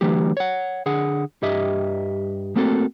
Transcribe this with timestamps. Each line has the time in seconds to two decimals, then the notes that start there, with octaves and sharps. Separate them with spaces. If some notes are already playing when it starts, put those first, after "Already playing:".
0.01 D3 E3 F#3 A3 G4
0.37 C#5 F#5
0.86 D3 G#4 F#5
1.42 G2 G4 D#5 E5
2.56 A3 A#3 C4 F#4 A4